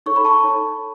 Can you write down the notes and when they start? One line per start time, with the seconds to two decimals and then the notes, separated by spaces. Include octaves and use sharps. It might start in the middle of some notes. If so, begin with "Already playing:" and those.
0.06 D#4 A4 C#5 C#6
0.16 B5
0.25 A5 C#6
0.43 D#4 A4 C#5